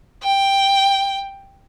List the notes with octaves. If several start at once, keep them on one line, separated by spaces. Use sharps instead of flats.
G5